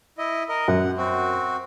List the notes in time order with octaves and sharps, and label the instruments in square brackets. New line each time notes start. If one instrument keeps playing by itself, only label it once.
[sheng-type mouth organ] E4 D#5
A#4 D#5
[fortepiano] F#2 [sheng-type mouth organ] F#5
[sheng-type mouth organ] C4 F#4